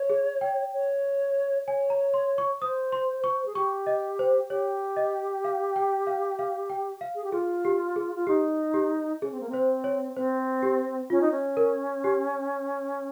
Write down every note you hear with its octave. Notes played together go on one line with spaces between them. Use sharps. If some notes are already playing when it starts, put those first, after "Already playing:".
Already playing: C#5
G#4
G5
C#5
C#5 G#5
A#5
C6
C#6
C5 D#6
C6
C#6
G#4
G4 C#6
D#5
C5
G4 C#5
D#5
F5
G5
F5
F5
G5
F5
G#4
G4
F4 G#4
G4
G#4
F4
D#4 G4
G4
C#4 G#4
C4
A#3
C4 C5
C#5
C4 C5
G4
C#4 F4
D#4
C#4
A#4
G4